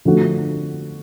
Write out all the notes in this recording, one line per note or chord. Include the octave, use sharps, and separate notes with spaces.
D3 F3 A3 D4 F#4